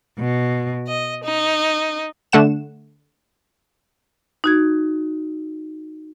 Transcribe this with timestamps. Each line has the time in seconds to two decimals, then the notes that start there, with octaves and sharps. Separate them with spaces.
0.18 B2
0.88 D#5
1.25 D#4
2.32 D3 A3 F#5 E7
4.44 D#4 F#4 G#6